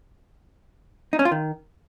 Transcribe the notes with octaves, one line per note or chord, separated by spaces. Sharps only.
D#4
C#4
F4
D#3